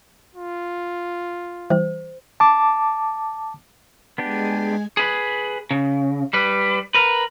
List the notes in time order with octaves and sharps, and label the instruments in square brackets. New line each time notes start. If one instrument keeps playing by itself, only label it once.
[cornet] F4
[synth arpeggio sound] E3 G3 [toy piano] C5
[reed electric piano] A5 D6
[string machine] G#3 G#5 [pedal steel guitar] B3 D4 G4
[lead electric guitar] G#4 B4
C#3
G3 B4
A#4 B4